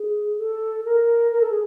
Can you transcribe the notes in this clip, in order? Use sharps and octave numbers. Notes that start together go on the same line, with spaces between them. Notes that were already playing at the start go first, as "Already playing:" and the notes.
Already playing: G#4
A4
A#4
A#4
A4
G#4